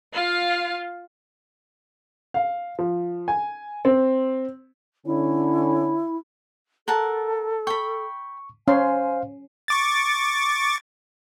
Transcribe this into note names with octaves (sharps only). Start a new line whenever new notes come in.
F4 F5
F5
F3
G#5
C4
D3 C#4 E4
A4 A#4 F#5 A5
G5 B5 C#6
C#4 C5 F5 G#5 C6
C#6 D6 A6